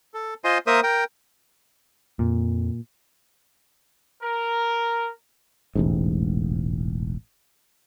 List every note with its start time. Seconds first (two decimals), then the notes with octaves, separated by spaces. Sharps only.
0.14 A4
0.44 F4 C5 D#5 G#5 C6
0.67 A#3 A#4 C5 E5 D#6
0.83 A#4 G5
2.19 F2 A#2
4.22 A#4
5.75 E1 A1 G#2